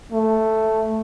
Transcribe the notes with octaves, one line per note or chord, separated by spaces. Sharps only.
A3